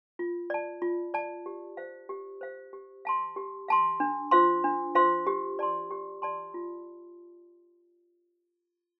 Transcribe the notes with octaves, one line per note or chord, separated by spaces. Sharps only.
F4
D5 A5
F4
D5 A5
G4
C5 F5
G4
C5 F5
G4
F5 A5 C6
G4
F5 A5 C6
D4
F4 C5 F5 C6
D4
F4 C5 F5 C6
G4
D5 A5 C6
G4
D5 A5 C6
F4